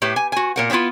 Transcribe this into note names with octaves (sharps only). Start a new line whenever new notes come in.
A2 G4 B4
G#5
F#4 G#5
A#2 A#4 F#5
D#3 F3 B3 E4 F4